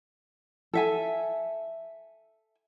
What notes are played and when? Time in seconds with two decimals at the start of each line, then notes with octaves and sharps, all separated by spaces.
0.73 A4 E5 G#5